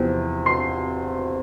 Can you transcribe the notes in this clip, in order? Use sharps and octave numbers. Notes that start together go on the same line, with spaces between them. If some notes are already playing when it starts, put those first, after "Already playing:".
Already playing: E2 C3 F3 C4
C6 C7